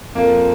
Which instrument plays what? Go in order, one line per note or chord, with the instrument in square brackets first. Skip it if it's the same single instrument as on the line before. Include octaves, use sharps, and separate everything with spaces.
[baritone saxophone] F2 [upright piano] A#3